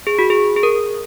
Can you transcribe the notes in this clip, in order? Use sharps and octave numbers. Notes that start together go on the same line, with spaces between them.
G#4
F#4
G#4
G#4
A#4